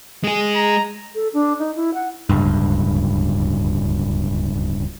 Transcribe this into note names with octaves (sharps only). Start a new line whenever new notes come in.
G#3 G#4
A#5
A4
D4
D#4
E4
F#5
D1 C#2 G2